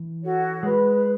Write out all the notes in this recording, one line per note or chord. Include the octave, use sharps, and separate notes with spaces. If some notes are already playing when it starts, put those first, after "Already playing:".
Already playing: E3
F#4 A4 C#5
G#3 B4